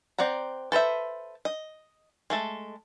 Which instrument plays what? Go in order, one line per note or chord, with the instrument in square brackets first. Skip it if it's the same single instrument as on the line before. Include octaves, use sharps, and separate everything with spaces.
[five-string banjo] C4 D5 F#5 A#5
A4 B4 C5 E5
D#5
G#3 A3 A4